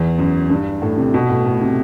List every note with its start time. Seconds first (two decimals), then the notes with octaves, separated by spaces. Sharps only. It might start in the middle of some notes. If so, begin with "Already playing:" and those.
Already playing: E2
0.19 F#2
0.50 G2
0.82 A2
0.98 C3
1.14 B2
1.30 A2
1.46 A2
1.62 C3